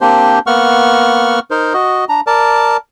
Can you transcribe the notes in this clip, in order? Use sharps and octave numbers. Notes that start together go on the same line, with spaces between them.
A#3 C4 D4 G4 C5
A#3 B3 F#5 C#6 F6
D#4 A#4 C5
F#4 D#5
D4 A#5
A#4 D5 A5